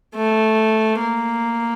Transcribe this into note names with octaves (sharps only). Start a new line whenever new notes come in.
A3
A#3